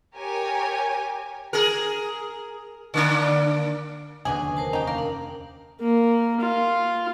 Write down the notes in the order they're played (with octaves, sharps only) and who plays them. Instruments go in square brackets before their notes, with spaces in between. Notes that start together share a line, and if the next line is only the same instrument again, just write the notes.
[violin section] G4 A#4 C#5 G#5
[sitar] G#4 A#4
D3 A#3 D4
[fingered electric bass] F1 D#2 D3 [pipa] B2 C#4 G#4 [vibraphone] D4 D6
[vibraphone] A#4 C5 A5
[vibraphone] C#4 [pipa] D#4 G4
[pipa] A#3 [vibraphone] A#4
[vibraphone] D4
[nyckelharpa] A#3
F4